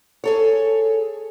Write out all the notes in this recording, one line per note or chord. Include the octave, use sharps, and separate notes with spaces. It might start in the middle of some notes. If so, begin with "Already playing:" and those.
G#4 A4 C#5